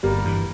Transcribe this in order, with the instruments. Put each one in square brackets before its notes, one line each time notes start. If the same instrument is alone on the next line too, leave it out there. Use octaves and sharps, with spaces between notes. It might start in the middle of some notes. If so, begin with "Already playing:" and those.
[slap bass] G1 [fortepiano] G3 A#3
[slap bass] G2 E3